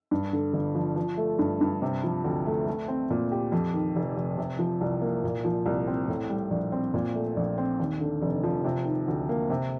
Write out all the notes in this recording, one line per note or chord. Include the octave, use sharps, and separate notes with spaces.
G2
D3
G1
F3
F3
A3
G2
G2
C3
F3
D2
A3
A3
C4
A#2
G4
F2
D#3
F1
F1
C3
F3
C2
A#3
A#2
F3
C2
C4
A2
G3
A#1
C4
A#2
A3
A#1
C4
D#2
D3
F1
F3
C3
D#3
D2
A#3
C3